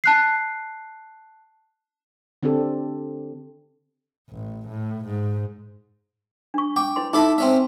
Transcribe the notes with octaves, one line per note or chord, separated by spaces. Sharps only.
A5 F#6 C7
D3 C4 D4 G4 A4
A1
A2
G#2
D4 C#6
G5 D6
E4 B4 C6
D#4 E4 A4 B5 D6
C4 C#4 E5